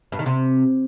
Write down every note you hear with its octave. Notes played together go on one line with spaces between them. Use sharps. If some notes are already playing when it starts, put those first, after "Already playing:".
G2
D#3
C3